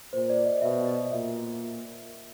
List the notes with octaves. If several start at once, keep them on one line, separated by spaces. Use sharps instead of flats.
A#2 C5
D5
D#5
B2 E5
D#5
D#5
A#2 E5